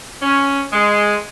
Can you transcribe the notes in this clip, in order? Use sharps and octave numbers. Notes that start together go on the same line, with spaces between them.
C#4
G#3